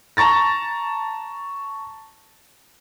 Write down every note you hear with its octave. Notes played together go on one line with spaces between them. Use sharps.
A5 A#5 C#6 A6 A#6